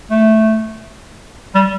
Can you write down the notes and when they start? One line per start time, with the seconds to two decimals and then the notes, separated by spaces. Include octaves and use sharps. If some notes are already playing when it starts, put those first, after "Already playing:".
0.11 A3
1.55 G3